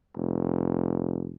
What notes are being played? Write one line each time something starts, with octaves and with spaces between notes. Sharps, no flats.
F1